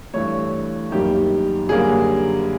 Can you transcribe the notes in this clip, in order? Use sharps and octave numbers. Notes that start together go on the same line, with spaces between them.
G2 E3 A3 C#5
F#2 D#3 G3 A#3 G4
F#2 D3 G3 A#3 G#4